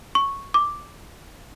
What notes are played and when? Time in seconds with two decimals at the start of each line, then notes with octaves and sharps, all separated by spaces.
0.15 C#6
0.54 D6